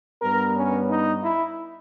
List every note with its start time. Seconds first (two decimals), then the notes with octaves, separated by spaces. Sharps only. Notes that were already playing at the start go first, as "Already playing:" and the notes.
0.21 G2 G3 B3 A#4
0.55 C#4
0.89 D#4
1.23 E4